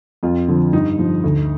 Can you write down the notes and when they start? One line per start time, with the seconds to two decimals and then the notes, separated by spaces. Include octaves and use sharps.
0.23 F2 F4
0.48 D3 F3
0.73 G2 D#4
0.99 F3
1.24 D2